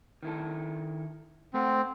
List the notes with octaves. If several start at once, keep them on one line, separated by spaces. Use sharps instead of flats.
D#3 E4 A4
A3 C4 A4 F#5